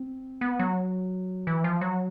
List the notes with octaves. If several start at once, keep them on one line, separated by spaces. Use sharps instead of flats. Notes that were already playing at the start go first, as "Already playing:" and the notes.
Already playing: C4
B3
F#3
E3
F3
F#3